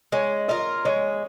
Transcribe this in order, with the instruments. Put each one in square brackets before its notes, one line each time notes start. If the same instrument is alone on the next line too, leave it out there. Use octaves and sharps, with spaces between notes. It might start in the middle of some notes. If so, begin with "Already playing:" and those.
[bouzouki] G#3 [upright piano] C#5
[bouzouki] F4 A#4 [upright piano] D#5
[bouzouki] G#3 [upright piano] C#5